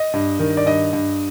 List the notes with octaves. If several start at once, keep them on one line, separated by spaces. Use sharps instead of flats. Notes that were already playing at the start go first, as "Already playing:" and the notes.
Already playing: D#5
G2
D#3
D5
G2 D#5
G2